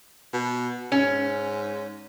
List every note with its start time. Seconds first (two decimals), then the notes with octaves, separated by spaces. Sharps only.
0.33 B2
0.92 G#2 C#4